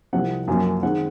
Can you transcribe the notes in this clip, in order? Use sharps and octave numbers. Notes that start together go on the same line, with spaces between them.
C2 C3 F3 C4 F#5
F#2 F3 A#3 C#4 G#5
D#3 G#3 C4 F#5